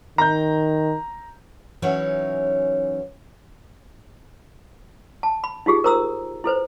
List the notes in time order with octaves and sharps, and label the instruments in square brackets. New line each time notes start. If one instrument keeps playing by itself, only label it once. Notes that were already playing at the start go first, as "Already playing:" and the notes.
[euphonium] D#3 [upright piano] A#5 G6
[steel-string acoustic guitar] E3 F#3 C#4 D#4 E4 C#5
[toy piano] A5
B5
D#4 F4 G4 G#4
A#4 C5 A#5 D#6 E6
E4 A4 B4 C5